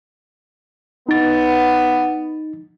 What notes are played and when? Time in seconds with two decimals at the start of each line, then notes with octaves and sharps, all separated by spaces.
1.09 B3 D#4 A6